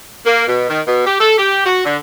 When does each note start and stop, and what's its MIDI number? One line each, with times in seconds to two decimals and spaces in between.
0.25 0.43 58
0.47 0.65 47
0.68 0.80 51
0.87 1.03 47
1.05 1.18 67
1.19 1.33 69
1.37 1.63 67
1.65 1.82 66
1.85 1.95 50